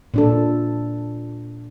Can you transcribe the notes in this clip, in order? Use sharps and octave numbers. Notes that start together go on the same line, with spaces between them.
A#2 D4 A4